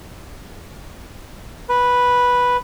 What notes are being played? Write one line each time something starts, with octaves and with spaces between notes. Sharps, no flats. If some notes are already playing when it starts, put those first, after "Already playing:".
B4